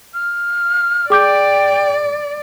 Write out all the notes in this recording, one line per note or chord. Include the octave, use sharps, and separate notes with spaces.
F6
G#4 D5 G5 D6 G6